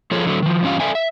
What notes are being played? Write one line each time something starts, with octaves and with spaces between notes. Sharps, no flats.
F3 F4 G#4 A4 C#5
D3 F#3 A3
D#3 F3
G2 E3 C#4 F4 G4 F5
A4 D5 E5 F5 G#5
E5